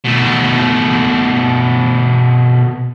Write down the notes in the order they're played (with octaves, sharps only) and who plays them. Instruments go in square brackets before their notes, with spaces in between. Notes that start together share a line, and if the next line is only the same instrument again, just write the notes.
[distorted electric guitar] B2 A3